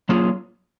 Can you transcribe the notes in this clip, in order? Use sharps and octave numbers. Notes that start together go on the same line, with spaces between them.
F#3 A#3 C#4 F4 G#4